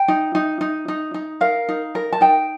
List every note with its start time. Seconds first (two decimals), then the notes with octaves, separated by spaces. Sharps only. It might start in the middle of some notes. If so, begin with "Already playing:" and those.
Already playing: G5
0.08 D#4
0.35 D#4
0.61 D#4
0.88 D#4
1.14 D#4
1.41 A#4 F5
1.69 D#4
1.95 A#4
2.13 A5
2.21 D#4 G5